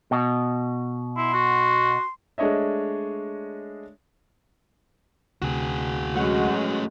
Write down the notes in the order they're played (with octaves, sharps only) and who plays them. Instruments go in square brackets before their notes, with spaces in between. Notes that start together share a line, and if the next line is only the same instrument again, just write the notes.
[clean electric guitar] B2
[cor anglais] E4 [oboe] C6
[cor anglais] F#4
[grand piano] G#3 A3 D4 C#5 D#5 E5
[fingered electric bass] D2 C3 [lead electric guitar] F#4 G#4
[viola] F#3 G#3 [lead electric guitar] A3 C#4 [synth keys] F#4 F#5